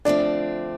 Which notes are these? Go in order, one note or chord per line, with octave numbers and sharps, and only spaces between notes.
D3 F3 A3 C4 D4